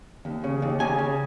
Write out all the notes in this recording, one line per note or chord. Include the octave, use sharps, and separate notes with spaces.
D#2
C#3
D#2
C#3 G#5
C#3